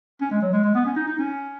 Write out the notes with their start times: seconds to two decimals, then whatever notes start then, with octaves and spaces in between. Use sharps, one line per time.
0.21 C#4
0.31 G#3
0.42 F#3
0.53 G#3
0.64 G#3
0.75 B3
0.86 C#4
0.96 D#4
1.07 D#4
1.18 C#4